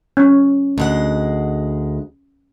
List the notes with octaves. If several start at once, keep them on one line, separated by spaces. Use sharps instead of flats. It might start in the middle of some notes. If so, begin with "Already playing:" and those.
C#4
D2 G#3 F#5